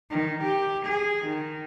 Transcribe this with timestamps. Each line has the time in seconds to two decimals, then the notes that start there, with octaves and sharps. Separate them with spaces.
0.10 D#3
0.43 G4
0.85 G#4
1.25 D#3